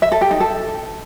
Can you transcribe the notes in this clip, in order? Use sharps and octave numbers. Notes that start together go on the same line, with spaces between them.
E5
A4
G4
D#4
A4